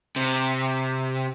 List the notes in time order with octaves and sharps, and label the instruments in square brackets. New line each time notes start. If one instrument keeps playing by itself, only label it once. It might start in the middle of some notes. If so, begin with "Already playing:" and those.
[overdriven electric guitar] C3